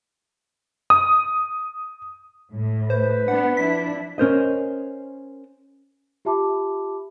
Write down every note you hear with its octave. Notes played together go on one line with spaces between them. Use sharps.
D#6
A2
B4 C5
B3 D4 F#5
F3 D4 E4 B6
C#4 A#4 C5 D#5
F4 G4 E5 A5 B5 D6